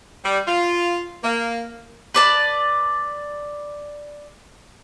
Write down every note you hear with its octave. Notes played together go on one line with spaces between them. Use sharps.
G3
F4
A#3
B4 D5 A5